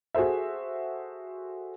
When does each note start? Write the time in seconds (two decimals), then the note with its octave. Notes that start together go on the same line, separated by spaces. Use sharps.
0.15 F#4 G#4 A4 C5 E5